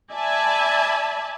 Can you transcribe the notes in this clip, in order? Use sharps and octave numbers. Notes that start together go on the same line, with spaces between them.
D5 E5 G#5 A5 B5